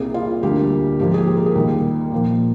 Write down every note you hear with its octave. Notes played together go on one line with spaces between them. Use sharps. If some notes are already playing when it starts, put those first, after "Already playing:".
Already playing: C2 C3 G3 A#3 G#4
F4
D2 D3 G3 A#3 G4
G#2 F3 A#3 G4
G#4
G4
G#4
A#4
G#4
D#2 D#3 G3 A#3 A#4
A#2 F3 A#3